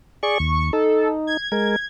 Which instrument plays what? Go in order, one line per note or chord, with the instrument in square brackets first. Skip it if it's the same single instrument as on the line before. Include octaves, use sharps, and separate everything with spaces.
[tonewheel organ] G#4 D5 [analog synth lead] C#6
[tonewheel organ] D#2
[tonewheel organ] D#4 [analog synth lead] A4
[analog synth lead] G#6
[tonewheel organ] G#3 A#4